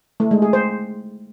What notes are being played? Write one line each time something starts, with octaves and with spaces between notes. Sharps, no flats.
A3
G#3
G#4
C5